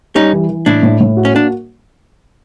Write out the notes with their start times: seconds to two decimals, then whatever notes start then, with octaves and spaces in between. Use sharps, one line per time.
0.15 G3 C#4 D#4
0.33 E3
0.49 E3
0.66 A2 D4 E4
0.83 A2
1.01 A2
1.17 F#4
1.25 C#4
1.34 A#3 D4